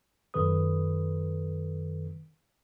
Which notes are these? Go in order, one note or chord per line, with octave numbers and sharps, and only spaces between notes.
F#2 D#3 A4 B4 D#6